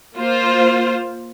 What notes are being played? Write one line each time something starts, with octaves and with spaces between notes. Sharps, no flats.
A#3 F4 C5